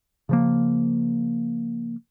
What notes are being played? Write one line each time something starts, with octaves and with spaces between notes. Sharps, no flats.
C#3 F3 A#3